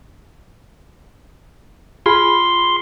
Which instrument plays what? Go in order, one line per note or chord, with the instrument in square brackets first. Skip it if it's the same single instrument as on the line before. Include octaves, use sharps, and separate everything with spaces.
[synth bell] F4 G#4 B5 [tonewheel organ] C6